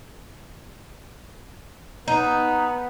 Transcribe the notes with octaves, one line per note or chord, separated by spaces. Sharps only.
B3 D#4